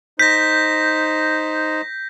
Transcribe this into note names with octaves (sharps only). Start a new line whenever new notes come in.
D#4 C5 G6 A#6 B6